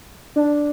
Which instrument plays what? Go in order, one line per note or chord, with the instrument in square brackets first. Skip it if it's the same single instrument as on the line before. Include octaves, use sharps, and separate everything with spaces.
[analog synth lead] D4